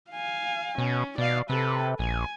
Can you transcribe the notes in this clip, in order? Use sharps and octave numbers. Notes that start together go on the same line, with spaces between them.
F5 G#5
B2 C#4
B2 D5 F5
C3 A4 B4
A#1 G#5